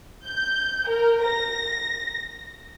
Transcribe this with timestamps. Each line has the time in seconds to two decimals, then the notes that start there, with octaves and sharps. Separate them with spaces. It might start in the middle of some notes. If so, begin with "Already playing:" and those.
0.25 G6
0.87 A#4
1.24 A#6